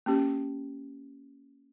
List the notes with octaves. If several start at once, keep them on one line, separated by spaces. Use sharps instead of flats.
A#3 C#4 G4